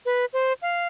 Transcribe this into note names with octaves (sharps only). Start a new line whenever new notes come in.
B4
C5
F5